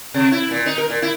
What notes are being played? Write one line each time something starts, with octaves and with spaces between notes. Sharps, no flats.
C3
E4
A#2
D#4
A#4
A#2
E4